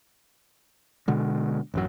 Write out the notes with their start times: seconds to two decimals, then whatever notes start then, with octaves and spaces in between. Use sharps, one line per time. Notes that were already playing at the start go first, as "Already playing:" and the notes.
1.08 B2 D3 G#3
1.74 A1 F#2 F#3